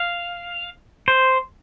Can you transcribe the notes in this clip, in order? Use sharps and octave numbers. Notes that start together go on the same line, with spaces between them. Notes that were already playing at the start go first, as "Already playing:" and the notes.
Already playing: F5
C5